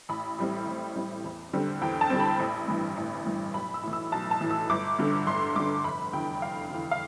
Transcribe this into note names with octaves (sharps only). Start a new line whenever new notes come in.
A1 B5
A2 G3 C4
A1
A2 G3 C4
E2
D3 G3 C4
E2 G5
A5
D3 G3 C4
B5
A1
G2 E3
A1
G2 E3
B1 B5
E6
A2 E3
E6
B1 A5
A5
A2 E3
E6
G1 D6
G2 D3
G1 C6
G2 D3 D6
F1 B5
E2 D3 G5
F1 F5
E2 D3
F5